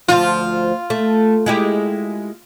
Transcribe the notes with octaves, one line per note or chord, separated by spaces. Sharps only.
D2 F3 F4
A3
G#3 E4 G4